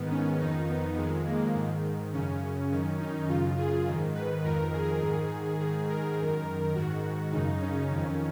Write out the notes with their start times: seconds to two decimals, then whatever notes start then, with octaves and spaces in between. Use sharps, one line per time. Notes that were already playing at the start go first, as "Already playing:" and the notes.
Already playing: G#2 D#3 B3
0.11 C#4
0.40 F2 D#3 D#4
0.69 B3
0.97 F2 D#3 G#3
1.26 A#3
1.55 G#2 D#3
2.13 F#2 C#3 C#4
2.71 F#2 D#3 C#4
3.00 D#4
3.28 F#2 C#3 F4
3.58 G#4
3.87 G#2 D#3
4.15 B4
4.44 F2 D#3 A#4
4.73 G#4
5.02 G#2 D#3
5.59 G#2 D#3 G#4
5.88 A#4
6.17 F#2 D#3
6.75 G#2 D#3 F#4
7.32 F#2 C#3 D#4
7.61 C#4
7.91 F2 D#3